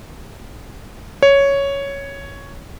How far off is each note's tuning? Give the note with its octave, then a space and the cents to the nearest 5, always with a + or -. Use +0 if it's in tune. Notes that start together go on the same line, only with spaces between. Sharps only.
C#5 +5